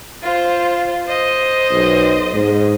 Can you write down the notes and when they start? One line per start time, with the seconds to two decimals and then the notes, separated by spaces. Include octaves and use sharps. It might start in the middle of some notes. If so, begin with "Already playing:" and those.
0.22 F4 C5
1.06 C5 D#5
1.72 B1
2.33 G#2